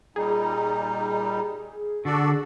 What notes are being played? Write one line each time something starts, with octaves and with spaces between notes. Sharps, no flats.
A#2 G3 D#4 G#4
D3 F#4 A4 D5